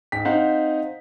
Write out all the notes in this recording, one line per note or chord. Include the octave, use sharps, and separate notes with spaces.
G#2 G5 B6
C4 D#4 C5 F5 F#5